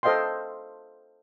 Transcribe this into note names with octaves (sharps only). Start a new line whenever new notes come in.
A4 C5 D#5 F5 G5 C6